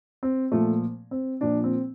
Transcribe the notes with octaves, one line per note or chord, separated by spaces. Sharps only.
C4
A#2 F3 A3
C4
A#2 F3 D4
C4